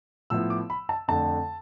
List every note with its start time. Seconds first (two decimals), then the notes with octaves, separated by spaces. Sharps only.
0.30 A2 F3 B3 E4 E6
0.50 D6
0.70 B5
0.89 A5
1.08 F2 D3 A3 D4 A5